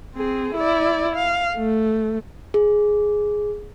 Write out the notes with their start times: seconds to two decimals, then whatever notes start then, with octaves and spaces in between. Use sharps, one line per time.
0.15 C4 G#4
0.55 E4 D5
1.15 F5
1.57 A3
2.54 G#4